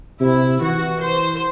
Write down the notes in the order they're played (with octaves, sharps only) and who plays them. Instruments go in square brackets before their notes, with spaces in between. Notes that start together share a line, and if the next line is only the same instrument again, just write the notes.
[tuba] C3 [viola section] E4
[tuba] E3 [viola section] F#4
[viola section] C5